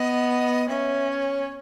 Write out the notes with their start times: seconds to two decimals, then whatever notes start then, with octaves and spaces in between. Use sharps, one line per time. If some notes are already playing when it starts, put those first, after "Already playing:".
Already playing: B3 D#5
0.69 C#4 E5
1.11 C#5